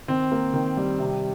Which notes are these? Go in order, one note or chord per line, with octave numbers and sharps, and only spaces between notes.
D#3 C4
A#3
D#3
G3
C3